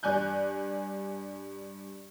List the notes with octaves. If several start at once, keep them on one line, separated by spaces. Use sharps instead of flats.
G2 D5 G#5 F#6 G6